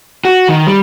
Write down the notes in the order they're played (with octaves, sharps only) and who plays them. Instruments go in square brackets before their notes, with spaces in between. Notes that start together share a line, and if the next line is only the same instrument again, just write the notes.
[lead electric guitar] F#4
D#3
G3